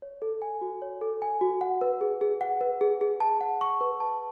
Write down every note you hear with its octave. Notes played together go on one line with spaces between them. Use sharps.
C#5
A4
G#5
F#4
C#5
A4
G#5
F#4
F#5
B4
G#4
G#4
F#5
B4
G#4
G#4
A5
F#5
C#6
B4
A5